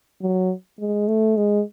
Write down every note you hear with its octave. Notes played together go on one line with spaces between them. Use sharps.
F#3
G#3
A3
G#3